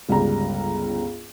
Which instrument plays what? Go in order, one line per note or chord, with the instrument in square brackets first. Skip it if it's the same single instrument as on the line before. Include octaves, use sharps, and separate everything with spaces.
[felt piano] G1 C#2 G3 A#5